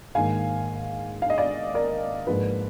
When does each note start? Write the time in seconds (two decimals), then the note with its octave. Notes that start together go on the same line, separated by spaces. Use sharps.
0.15 G#2 D#3 A#3 F5 G#5
1.22 F5
1.30 D#5
1.38 D5 F5
1.74 A#4 D5
2.27 G#2 F3 A#3 B4